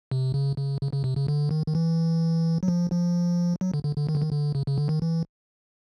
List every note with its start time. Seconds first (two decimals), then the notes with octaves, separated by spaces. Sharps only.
0.11 C3
0.34 C#3
0.57 C#3
0.81 C#3
0.93 C#3
1.04 C3
1.16 C#3
1.28 D3
1.51 D#3
1.67 D#3
1.75 E3
2.63 F#3
2.68 F3
2.92 F3
3.61 F#3
3.74 D3
3.84 D3
3.97 D3
4.09 D#3
4.15 D3
4.22 D#3
4.32 D3
4.55 C#3
4.66 C#3
4.78 D3
4.89 D#3
5.02 E3